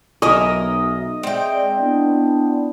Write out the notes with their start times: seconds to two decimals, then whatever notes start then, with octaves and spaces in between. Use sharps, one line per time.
0.22 B1 A#4 D#5 E5 G#5
1.23 G#3 C4 D5 E5 G5
1.79 B3 D4 E4